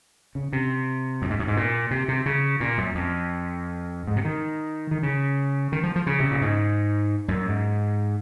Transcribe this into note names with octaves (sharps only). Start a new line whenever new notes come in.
C#3
C3
F#2
G#2
F#2
G#2
A#2
C3
C3
C#3
A#2
F#2
F2
G#2
C3
D#3
D#3
C#3
D#3
F3
F3
C#3
C3
A#2
G#2
F#2
G#2